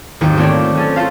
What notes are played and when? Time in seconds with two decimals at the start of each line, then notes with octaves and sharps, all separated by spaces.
0.21 G#1 D#2 C4 D#4 G5 C#7
0.37 A3 C4 F4 C#5 D5
0.75 A3 C#4 A4
0.96 F4 A4 C5 F5